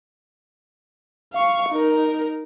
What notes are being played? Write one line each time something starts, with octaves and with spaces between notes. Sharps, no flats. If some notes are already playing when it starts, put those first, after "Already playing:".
F5 C#6
D#4 A#4